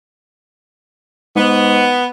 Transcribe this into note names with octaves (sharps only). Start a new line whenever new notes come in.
G#2 B3